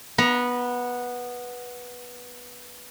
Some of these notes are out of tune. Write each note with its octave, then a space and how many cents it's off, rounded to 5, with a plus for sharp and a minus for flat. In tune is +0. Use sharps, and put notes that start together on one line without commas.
B3 -10 A#5 +25